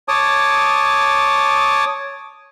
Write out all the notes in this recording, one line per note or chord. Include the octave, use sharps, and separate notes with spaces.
C#5 A5 D6 D#6